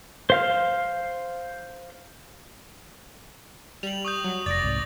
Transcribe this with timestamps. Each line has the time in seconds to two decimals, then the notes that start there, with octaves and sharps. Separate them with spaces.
0.30 C5 F5 F6
3.83 G3 F7 F#7
4.05 C#6 D#6 G6
4.24 F#3
4.46 F1 D5 A6 A#6
4.63 C2 G#2